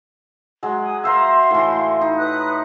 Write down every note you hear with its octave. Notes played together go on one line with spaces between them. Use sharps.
F#3 G#3
G#5 D#6
A#4 C5 E5 F5 C6 C#6
A2 E3
D#4
B4 D#6 F#6